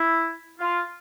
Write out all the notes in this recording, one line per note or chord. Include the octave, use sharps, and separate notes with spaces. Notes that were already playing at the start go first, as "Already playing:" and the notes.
Already playing: E4
F4